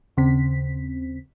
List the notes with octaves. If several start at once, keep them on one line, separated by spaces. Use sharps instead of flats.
D#2 C#3 C4 B6